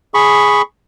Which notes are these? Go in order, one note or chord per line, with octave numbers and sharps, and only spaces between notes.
G#4 B5 C#6